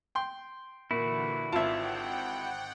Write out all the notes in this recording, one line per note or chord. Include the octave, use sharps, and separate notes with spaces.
G5 C6
A#2 D3 E3 E4 F#4
G#1 F4 E5 F#5 G5 A5